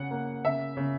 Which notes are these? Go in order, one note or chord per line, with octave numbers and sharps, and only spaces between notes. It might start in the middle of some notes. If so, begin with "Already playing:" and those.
Already playing: C#3 F#5
A#3
C#3 E5
C#3